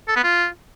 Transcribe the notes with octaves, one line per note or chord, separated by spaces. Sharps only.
A4
B3
F4